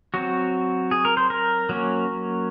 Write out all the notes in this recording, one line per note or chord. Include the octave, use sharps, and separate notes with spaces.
F#3 C4 F#4
G#4
A#4
C5
A#4
F#3 A#3 C#4